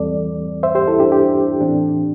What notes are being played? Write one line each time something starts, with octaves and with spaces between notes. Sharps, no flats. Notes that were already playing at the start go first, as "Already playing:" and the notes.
Already playing: E2 E3 G3 C4 A4 D5
C5 E5
G4 C5
E4 A4
D4 G4
D4 G4
A2 E3 C4 D4